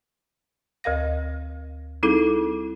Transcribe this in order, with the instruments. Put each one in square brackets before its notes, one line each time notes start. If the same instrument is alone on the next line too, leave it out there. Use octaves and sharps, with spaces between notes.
[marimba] D2 A#4 F5 A#6
G3 C4 D#4 E4 G#4 A4